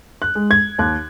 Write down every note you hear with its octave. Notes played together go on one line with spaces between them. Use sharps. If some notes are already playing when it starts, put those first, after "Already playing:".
F#6
G#3
G#6
D#2 F#6